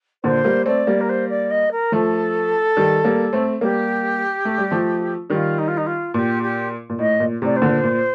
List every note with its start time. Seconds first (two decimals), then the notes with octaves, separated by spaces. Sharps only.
0.24 A#2 D3 C5
0.44 G3 A#3
0.66 A3 C4 D5
0.87 G3 A#3
1.00 A#4
1.09 C5
1.29 D5
1.50 D#5
1.71 A#4
1.92 F3 A3 A4
2.77 D#3 G3
3.05 G3 A#3
3.33 A3 C4
3.61 G3 A#3 G4
4.45 A3
4.58 G3
4.71 F3 A3
5.30 D#3 G3 F4
5.58 D#4
5.67 F4
5.77 D#4
5.86 F4
6.14 A#2 G4
6.42 G4
6.89 A#2
6.98 A2 D#5
7.20 A#2
7.42 A2 C3 D5
7.56 C5
7.62 A#2 D3
7.83 A#2